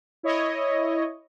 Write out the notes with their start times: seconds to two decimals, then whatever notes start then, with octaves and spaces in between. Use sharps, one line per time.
0.23 E4 C#5 D#5